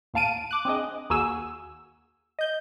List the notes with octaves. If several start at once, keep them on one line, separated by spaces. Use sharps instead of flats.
D#2 A2 F5 A5 D7 D#7
D6 F#6
C4 D4 G#4 D#5
D#2 A#3 F#4 G#4 G#5 E6
D#5 G6